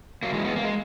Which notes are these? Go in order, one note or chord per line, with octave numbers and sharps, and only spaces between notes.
F#3 A#3
E3 G#3
G#3 B3
A#3
G#3